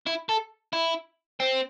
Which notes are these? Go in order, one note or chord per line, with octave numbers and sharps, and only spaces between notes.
E4
A4
E4
C4